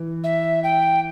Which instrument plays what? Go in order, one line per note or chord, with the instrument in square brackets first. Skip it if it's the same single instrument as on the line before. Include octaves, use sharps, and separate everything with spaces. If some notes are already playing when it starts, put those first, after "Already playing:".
Already playing: [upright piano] E3
[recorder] E5
G5